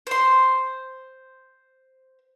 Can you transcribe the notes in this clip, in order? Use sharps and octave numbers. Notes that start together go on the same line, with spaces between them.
C5 C6